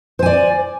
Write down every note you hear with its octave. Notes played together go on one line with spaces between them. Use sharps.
C5 D5 G#5